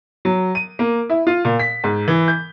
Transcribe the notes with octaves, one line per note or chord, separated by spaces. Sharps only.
F#3
D#7
A#3
E4
F4
A#2
B6
G#2
E3
G6